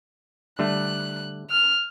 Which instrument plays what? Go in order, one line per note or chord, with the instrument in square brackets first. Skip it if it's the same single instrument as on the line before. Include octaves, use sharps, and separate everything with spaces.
[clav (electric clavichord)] D3 G3 A3 [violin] F#6
[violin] F6